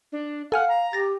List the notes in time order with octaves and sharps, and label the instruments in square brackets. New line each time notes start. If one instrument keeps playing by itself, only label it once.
[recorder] D4
[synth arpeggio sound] A4 G#5 F6 [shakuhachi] F5 [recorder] F#5
[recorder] A#5
[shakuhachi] G4 [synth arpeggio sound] A6 A#6